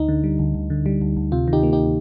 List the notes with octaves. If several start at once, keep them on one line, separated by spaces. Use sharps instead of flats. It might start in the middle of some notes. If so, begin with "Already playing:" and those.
Already playing: D2 D#4
D3
G3
D2
D2
D3
G3
D2
D2
C3 F4
D#3
D#4 G4
A#3
D#4 G4